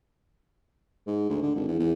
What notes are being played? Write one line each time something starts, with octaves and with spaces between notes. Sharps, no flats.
G#2
D2
D3
G#1
E2
E2